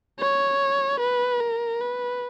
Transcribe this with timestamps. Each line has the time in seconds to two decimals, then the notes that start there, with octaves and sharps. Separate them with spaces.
0.20 C#5
1.00 B4
1.40 A#4
1.81 B4